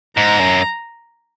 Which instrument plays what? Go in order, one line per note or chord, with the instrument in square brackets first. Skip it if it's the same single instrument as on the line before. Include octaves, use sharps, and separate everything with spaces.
[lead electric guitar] G#2 [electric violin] A#5
[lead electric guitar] F#2